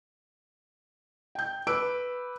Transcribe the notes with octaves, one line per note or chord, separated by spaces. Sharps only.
G5 G6
B4 D6 E6 D7